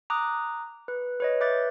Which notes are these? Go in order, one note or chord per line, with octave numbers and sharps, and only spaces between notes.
A#5 D6 D#6 F#6
B4
B4 C#5 D#5
B4 E5 D6 G6 A6